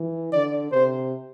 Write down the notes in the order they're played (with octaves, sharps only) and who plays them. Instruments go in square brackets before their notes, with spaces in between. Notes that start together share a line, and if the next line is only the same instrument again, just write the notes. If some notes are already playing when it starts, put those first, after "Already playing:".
Already playing: [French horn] E3
[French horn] D3 [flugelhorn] D5
[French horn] C3 [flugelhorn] C5